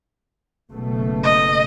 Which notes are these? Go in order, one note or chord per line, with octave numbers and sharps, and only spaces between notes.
F#1 B2 A3
D#5